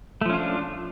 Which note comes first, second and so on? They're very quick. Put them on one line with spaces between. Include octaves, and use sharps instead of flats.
A3 F3 C#4 F4 D4